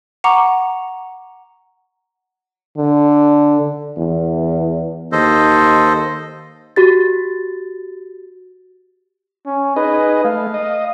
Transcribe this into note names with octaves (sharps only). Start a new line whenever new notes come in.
F#5 A#5 C#6 D6
D3
E2
D#2 A4 C5 D#5
F#4 G4 A6
C#4
D#4 G#4 B4 D#5
A3 F5
D#5